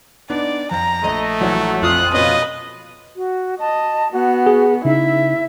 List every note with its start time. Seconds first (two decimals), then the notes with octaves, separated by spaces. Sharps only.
0.30 B3 D4 D#4 D5
0.71 F2 A#5
1.04 A#1 A3 D#5
1.41 A#1 E3 F#3 F#4
1.82 F2 F4 D#6 F#6
2.14 B2 B3 C#4 B4 D#5
3.16 F#4
3.60 D#5 A5
4.13 B3 F#4
4.47 G#4
4.85 C#3 D#4 E4 E5